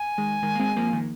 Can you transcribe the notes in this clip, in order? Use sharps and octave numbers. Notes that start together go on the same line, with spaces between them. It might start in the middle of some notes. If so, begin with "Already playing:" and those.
Already playing: G#5
D#3 G#3
D#3 G#3
A#3
G#3 C4
F3 A#3
D#3 G#3